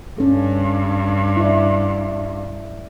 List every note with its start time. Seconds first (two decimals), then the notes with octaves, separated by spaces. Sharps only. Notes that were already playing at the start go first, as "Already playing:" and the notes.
0.18 G2 C#4 A4
1.37 E4 D5